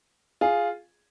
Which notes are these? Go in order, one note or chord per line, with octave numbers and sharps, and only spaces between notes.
F4 G#4